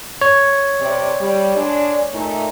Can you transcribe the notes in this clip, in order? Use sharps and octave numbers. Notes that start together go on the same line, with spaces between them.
C#5
C3 D5
G3
G#3 D4 D5
A#2 A3 D#4